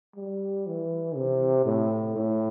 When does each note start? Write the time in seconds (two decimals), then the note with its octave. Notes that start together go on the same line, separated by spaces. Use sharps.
0.16 G3
0.67 E3
1.16 C3
1.65 A2
2.16 A2